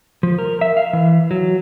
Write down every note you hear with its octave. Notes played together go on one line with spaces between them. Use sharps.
F3
A#4
E5
F5
E3
F#3